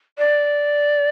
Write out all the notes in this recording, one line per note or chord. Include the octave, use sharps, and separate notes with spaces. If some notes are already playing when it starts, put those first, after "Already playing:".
D5